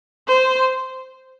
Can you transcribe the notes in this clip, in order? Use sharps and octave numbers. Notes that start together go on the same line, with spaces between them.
C5